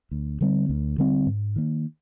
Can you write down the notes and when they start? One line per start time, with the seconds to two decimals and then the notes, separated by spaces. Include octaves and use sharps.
0.11 D2
0.41 D3 G3 C4
0.69 D2
0.98 D3 G3 C4
1.26 G#2
1.56 D#3 A#3